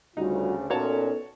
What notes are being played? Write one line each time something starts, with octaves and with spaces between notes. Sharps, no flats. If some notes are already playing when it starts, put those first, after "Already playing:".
D2 C#3 G3 D#4 F4 F#4
A#2 B3 C#4 D#4 F#4 A4 C#5 A5